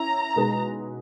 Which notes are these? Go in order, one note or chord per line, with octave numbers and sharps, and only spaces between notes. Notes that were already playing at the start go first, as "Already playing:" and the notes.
Already playing: C#4 E4 A#5
B2 G#3 D#4 G#4 B4